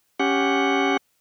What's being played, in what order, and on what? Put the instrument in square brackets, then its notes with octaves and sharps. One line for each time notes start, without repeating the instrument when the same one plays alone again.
[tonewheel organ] C#4 G4 F#5